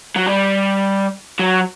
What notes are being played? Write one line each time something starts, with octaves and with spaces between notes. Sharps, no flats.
F#3
G3
F#3